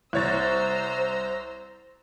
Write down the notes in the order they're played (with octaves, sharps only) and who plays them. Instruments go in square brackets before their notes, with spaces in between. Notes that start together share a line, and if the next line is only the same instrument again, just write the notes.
[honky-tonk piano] C2 C#5 A6 [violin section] C5 A#5 E6